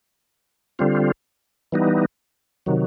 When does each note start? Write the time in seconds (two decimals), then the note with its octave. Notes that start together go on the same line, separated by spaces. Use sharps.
0.79 D3 G3 C4 F4
1.72 E3 G3 B3 D#4
2.66 C3 D#3 F#3